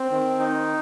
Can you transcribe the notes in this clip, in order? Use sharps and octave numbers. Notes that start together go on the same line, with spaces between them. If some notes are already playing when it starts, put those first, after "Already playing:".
Already playing: C4
D#3
D#4